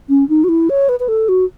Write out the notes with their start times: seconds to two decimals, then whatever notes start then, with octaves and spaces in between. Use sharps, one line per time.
0.09 C#4
0.29 D#4
0.44 F#4
0.49 E4
0.70 C#5
0.89 B4
1.00 B4
1.08 A4
1.29 F#4